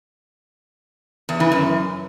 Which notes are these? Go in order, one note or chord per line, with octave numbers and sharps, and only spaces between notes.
E2
E3
F#2